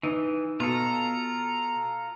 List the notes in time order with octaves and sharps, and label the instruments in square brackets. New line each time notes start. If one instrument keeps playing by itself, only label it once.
[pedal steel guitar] E3 [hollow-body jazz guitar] D#4
[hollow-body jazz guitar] B2 [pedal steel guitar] F4 A4 [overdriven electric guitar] A#5